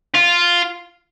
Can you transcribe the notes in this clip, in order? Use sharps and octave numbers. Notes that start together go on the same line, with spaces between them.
F4